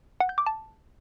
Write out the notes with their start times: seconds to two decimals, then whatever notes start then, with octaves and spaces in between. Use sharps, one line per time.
0.20 F#5
0.29 G6
0.38 D6
0.46 A5